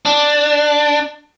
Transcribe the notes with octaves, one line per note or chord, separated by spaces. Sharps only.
D4